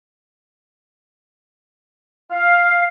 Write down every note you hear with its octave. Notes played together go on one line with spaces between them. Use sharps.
F5